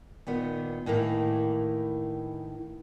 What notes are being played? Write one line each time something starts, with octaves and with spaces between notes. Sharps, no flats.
A#2 D#3 B3
A2 D#3 E3 A#3